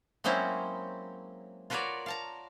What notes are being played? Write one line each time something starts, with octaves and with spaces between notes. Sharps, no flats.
F#3 G#3 A#3 C4 C#4 E4
F4 F#4 A#4 B4 C#5 D5
F5 A5 A#5